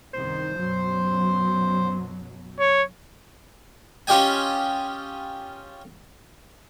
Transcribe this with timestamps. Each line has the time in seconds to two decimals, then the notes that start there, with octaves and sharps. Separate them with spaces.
0.13 C2 F#2 D#3 C5
0.56 F#2 B2 F#3
2.59 C#5
4.07 C#4 F4 G4 D#5 G5 G#5